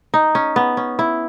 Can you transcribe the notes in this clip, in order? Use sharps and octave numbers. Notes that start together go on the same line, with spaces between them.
D#4
C#4
B3
C#4
E4